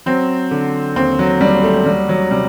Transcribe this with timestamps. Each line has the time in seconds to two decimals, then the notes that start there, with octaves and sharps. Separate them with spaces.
0.06 F#3 C4
0.51 D3
0.96 D#2 C4
1.19 F#3
1.41 D#2 G3
1.63 A3
1.86 F#3 G3
2.09 F#3
2.31 C3 G3